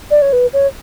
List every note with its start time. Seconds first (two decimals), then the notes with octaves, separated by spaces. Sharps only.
0.11 D5
0.22 C#5
0.33 B4
0.53 C#5